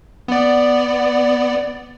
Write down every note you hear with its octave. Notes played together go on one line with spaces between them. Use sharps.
B3 D5